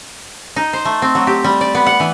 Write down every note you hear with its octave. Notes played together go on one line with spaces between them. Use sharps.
D#4
C5
A3
C4
F#3
G4
G3
D5
B3
F#5
E3